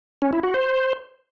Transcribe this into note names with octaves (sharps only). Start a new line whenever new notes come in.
C#4
E4
F#4
C5